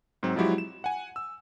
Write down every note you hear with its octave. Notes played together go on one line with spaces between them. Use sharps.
G#2 F#3 C4
F3 F#3 G#3 E4 F#4 G4
E7
F#5 G#5
E6